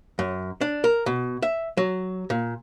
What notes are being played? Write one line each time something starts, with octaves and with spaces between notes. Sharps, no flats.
F#2
D4
A#4
B2
E5
F#3
A#2